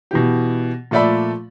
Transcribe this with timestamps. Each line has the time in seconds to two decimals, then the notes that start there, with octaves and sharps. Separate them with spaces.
0.11 B2 E3 G4
0.91 A#2 F3 A3 D5 E5 B5